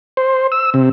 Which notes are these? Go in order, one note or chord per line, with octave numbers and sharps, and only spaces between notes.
C5
E6
C3